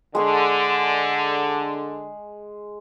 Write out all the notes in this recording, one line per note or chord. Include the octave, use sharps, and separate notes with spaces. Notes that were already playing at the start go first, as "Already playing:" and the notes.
D3 G#3 G#4 C#6